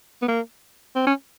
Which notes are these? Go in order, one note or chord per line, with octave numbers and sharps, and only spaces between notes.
B3
A#3
C4
C#4